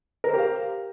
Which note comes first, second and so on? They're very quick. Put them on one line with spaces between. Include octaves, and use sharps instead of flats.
A#4 C5 G4 F5